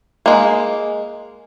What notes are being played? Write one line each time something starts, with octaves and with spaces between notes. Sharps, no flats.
G#3 A#3